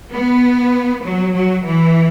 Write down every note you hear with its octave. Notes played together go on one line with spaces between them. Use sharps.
B3
F#3
F#3
E3